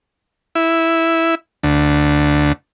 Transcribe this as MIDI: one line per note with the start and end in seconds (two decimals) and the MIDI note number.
0.55 1.35 64
1.63 2.53 38